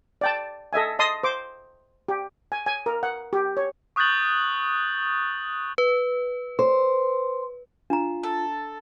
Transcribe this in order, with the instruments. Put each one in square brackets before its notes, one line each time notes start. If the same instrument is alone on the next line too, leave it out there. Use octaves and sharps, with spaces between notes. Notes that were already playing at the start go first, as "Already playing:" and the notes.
[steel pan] D5 G5 A5
A4 D#5 E5 G#5
D#5 A5 C6 D#6
C5 D6
G4
G#5
G#5
A#4
F#5
G4
C#5
[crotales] C#6 D#6 F#6 G6 A6 F#7
[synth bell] B4
[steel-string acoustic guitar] C5
[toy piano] D4 A#5 [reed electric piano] F4
[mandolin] A4